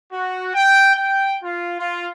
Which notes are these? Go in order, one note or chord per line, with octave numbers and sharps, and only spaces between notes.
F#4
G5
G5
F4
F4